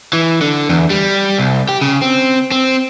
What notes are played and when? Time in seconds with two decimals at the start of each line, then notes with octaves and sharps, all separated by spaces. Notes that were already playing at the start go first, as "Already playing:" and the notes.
0.13 E3
0.41 D3
0.69 E2
0.90 G3
1.38 C2
1.69 G4
1.81 C#3
2.02 C4
2.51 C4